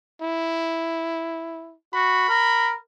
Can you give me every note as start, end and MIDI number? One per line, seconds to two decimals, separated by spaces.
0.22 1.75 64
1.94 2.29 66
1.94 2.77 83
2.29 2.73 70